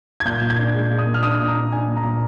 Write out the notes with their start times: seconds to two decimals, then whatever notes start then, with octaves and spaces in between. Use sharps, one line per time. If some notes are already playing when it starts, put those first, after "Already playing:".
0.20 G#6
0.25 A#2 G6
0.42 A#2
0.50 G#6
0.59 D4
0.75 G#3
0.91 A#2
0.98 D#6
1.07 A#2
1.14 F6
1.23 D4 D#6
1.40 A#2
1.48 A#5
1.56 D4
1.72 D4 G#5
1.88 A#2
1.97 A#5
2.04 A#2